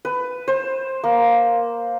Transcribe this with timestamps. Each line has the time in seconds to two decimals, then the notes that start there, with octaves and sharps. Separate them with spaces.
0.05 B4
0.48 C5
1.04 A#3